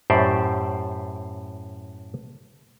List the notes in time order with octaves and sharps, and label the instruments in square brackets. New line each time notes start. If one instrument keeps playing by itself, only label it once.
[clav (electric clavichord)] F#2 A2 G4 C5 D5